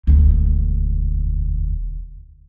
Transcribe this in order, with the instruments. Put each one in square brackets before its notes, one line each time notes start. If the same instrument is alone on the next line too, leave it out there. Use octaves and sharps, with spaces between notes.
[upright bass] E1 D2